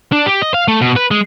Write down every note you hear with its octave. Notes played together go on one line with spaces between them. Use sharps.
D4
G4
D#5
F5
A3
B2
B4
G#3